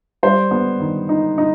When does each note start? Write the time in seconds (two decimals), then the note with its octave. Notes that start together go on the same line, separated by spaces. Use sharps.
0.23 G3 C5
0.51 B3
0.80 D#3
1.09 D#4
1.38 D#4